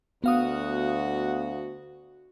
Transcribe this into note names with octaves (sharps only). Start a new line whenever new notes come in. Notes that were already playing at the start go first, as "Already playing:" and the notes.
D2 B3 F#4 F5 F#5 D#6